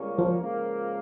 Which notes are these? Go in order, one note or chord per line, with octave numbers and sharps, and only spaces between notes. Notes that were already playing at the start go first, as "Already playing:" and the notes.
Already playing: C#2 C#3 G3 A#3 C#4
F3
C#2 C#3 F3 A#3